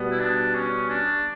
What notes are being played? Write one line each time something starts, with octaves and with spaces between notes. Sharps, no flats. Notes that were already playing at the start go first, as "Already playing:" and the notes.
Already playing: B2 G3 B3
E4
D4
C#4
D4